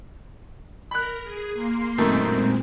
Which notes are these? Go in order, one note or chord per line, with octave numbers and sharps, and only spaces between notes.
A#4 B5 F#6
G#4
A#3 C6 C7
F#2 A#2 D#3 G#3 A3 C4